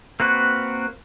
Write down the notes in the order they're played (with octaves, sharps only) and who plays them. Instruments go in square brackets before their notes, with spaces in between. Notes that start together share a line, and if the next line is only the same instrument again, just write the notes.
[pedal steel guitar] A#3 C4 F#4 B4